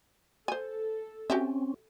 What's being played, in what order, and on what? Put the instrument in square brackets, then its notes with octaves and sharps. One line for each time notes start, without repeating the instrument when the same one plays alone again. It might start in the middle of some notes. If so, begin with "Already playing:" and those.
[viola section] A4 [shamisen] C5 G#5
[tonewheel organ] C4 C#4 [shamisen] F#4 G4 E5